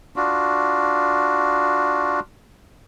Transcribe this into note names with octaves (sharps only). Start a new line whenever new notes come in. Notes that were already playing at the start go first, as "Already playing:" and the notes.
D4 F4 F#4